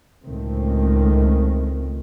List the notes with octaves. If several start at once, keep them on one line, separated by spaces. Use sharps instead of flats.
C#2 A2 D#3 A3 C4